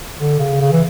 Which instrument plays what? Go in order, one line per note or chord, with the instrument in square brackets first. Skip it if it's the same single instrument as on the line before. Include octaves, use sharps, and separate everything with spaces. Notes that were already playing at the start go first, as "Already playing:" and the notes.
[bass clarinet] D3
C#3
C#3
E3